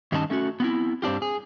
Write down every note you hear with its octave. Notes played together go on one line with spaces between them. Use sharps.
G2 D#3 C#4 D#4 D#5 A5
A3 C#4 D#4 F#4
B3 C4 E4
G2 C4 D4 F4 G4
G#4